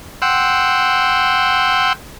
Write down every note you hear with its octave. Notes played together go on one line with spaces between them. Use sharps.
F#5 G5 C6 E6